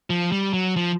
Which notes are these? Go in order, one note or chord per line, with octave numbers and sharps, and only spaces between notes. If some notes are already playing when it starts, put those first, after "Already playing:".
F3
G3
F#3
F3